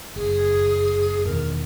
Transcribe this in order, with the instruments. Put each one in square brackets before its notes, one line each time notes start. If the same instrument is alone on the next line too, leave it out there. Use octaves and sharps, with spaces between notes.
[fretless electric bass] F#1 [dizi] G#4
[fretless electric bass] E2 B2 D#3 [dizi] A#4